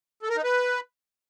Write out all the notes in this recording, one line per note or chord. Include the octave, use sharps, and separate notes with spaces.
A4
A#4
D#4
B4